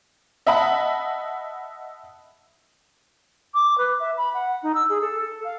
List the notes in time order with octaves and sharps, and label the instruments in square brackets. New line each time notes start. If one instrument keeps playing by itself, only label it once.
[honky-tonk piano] D#5 E5 F#5 A5 B5
[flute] D6
B4
E5
B5
F#5
D#4
E6
G#4
A4
A4
F5